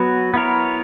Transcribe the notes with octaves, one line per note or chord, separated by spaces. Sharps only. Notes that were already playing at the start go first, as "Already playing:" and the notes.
Already playing: F#3 B3 F#4 B4
B3 E4 A#4 C#5